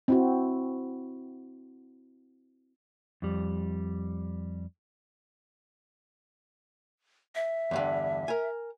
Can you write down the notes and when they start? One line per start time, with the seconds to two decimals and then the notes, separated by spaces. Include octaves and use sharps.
0.08 C4 E4 F#4
3.22 F2 G3
7.35 E5
7.71 E2 G2 D3
8.28 A#4 G#5